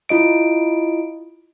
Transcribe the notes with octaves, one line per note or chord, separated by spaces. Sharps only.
E4 F4 D#5 D7